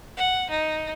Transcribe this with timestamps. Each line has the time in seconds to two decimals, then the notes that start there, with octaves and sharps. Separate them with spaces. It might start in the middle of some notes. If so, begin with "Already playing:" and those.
0.17 F#5
0.50 D#4